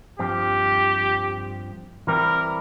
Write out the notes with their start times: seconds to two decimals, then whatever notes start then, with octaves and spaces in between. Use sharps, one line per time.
0.19 G2 F3 C4 G4
2.07 E3 G3 C4 E4 G4 A#4